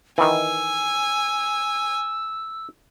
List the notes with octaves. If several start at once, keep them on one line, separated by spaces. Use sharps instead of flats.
D#3 E3 G#5 E6